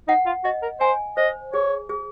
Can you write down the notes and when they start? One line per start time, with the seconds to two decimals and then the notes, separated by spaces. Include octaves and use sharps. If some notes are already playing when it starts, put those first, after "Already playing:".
0.08 D#4 F#5
0.26 F4
0.44 F#4 D#5
0.62 A#4
0.80 C5 G#5
1.17 C5 D#5
1.53 G#4 C#5
1.89 G#4